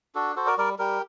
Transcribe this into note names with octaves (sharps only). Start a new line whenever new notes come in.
D4 F#4 A4
F#4 A4 C5
A#4 D5
G3 A#4 D5
G3 G4 A#4